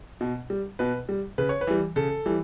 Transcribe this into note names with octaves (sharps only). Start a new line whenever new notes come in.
B2
G3
B2 B4
G3
C#3 B4
C#5
B4
E3 G3
C#3 A4
E3 G3